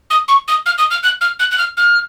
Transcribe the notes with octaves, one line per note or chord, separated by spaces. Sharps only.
D#6
C#6
D#6
F6
D#6
F6
F#6
F6
F#6
F#6
F6
F6